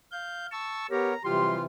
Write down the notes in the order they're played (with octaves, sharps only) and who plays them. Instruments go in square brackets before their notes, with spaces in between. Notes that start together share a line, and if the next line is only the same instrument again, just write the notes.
[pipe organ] F5 G6
A5 C#6 E6
[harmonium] B3 A#4 C#5 [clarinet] G4 [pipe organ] A#5
[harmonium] C3 E3 [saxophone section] F#3 F4 G4 [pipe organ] G3 [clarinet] C6